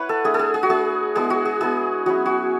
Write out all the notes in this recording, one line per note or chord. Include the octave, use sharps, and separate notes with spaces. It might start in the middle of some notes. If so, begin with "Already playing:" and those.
Already playing: E4 B4 C#5 F#5
A4
A3 D4 G#4
A4
G#4
G#4
F#4
A3 D4 G#4
G#3 B3 E4 G#4
F#4
G#4
G#3 B3 E4 G#4
F#3 C#4 E4 F#4
F#4